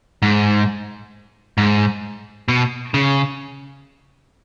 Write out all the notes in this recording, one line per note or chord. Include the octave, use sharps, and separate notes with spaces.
G#2
G#2
B2
C#3